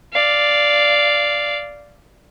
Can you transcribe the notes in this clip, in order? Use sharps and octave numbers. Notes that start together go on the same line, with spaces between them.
D5 F5